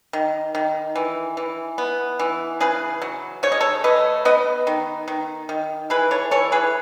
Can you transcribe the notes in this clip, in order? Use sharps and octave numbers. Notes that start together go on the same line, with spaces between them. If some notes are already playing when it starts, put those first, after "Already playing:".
D#3
D#3
E3
E3
B3
E3
C#3 G#4 B4
F#3
C#3 C#5
D#5
A4 C#5
A3 B4 D#5
B3 B4 D#5
D#3
D#3
D#3
E3 G#4 B4
A4 C#5
E3 A4 C#5
G#4 B4